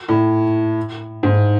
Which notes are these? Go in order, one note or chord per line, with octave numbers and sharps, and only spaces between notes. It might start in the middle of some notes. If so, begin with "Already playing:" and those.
A2
G#2